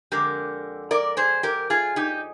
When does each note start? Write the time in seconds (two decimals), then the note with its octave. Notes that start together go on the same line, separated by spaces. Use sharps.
0.12 F2 D3 G#3 G4 A#4
0.91 A#4 D5
1.17 G#4 C5
1.43 G4 A#4
1.70 F4 G#4
1.96 D#4 G4